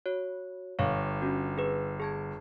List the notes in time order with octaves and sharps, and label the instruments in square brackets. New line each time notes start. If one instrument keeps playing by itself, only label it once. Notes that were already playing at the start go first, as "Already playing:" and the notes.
[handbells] F#4 C#5
[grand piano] G1 [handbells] C#5 F5 C#6
[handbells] C#4 F#4
G#4 B4
G#4 A5 G#6